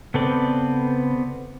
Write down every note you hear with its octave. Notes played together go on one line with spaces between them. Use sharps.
C#3 B3 C4 A4 B4 D5